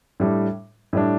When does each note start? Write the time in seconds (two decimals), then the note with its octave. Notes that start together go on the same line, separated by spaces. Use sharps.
0.20 A2 G3 D4
0.93 A2 G3 D4